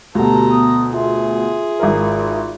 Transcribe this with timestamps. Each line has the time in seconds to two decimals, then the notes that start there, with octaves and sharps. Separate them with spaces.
0.15 D2 B2 G4 A4 A5 A#5
0.50 B3 D#6
0.92 F4 G#4 E5 C6
1.80 G#1 E4 A#4